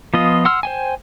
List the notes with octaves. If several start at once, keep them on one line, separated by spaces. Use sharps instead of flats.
F3 B3 F4 D#5
F#5 C6 E6 F6
C5 G5 G#5